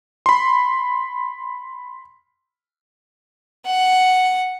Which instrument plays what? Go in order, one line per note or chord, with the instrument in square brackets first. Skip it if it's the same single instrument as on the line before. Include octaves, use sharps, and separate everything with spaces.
[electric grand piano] B5 C6
[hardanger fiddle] F#5